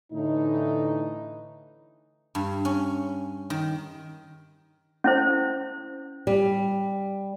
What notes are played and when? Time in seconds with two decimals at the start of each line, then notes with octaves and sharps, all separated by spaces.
0.13 A2 D3 E3 A3 D#4
2.35 G2
2.65 C#4
3.50 D#3
5.04 C#4 E4 C5
6.27 G3